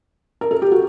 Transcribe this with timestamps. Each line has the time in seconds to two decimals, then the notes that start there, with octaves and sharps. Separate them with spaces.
0.41 A#4
0.51 A4
0.62 G4
0.71 F#4